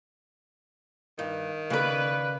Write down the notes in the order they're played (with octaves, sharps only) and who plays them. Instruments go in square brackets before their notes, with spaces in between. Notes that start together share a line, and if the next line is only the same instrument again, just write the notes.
[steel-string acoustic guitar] G2 [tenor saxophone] D#3
[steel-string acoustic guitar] C#3 D5 [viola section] B4